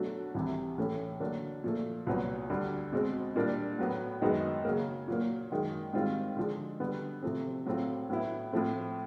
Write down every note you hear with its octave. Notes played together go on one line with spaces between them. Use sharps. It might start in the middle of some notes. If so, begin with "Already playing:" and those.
Already playing: B2 F#3 A3 D4 F#4
C2 C3 E3
A2 E3 A3 C#4
D3 F#3 A#3 D4
A#2 F3 A3
C2 A#2 F#3 B3
D2 D3 G3
B2 G#3 C4
A#2 G3 A#3 D4
A2 F#3 B3
F#2 D#3 G#3 B3 D#4
C#3 F#3 A#3
A#2 F#3 A#3
F#2 D#3 G#3
G#2 D#3 G3 C4 F4
D3 F3 G#3
D3 G3 B3
C3 F3 A3 C4
A2 F#3 A3 C4 F4
A2 F#3 B3 E4
A2 F3 A3 C4